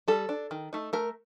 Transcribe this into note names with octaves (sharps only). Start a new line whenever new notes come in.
G3 A4
D4
D#3
A3 D#4
A3 A#4